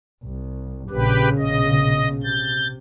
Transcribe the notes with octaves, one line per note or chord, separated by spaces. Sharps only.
C2
A#1 C#3 G4 B4
A#1 B2 D#5
C3 G6 A6